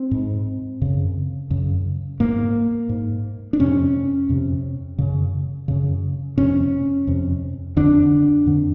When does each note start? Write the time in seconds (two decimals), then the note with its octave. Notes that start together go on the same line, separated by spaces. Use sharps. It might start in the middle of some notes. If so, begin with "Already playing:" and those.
Already playing: C4
0.11 G#2
0.81 F#2 C#3
1.50 F#2 C#3
2.20 G#2 A#3
2.89 G#2
3.53 D4
3.59 F2 C3 C#4
4.29 F2 C3
4.98 F#2 C#3
5.68 F#2 C#3
6.37 F2 C3 C#4
7.07 F2 C3
7.77 F2 D3 D4
8.46 F2 D3